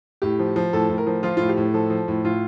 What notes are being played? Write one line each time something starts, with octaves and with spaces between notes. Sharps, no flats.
A2 G4
F3
F3
A2 A4
A2
A#4
F3
F3 F4
A2 F4
G4
A2
F3 A4
F3
A2
A2 F4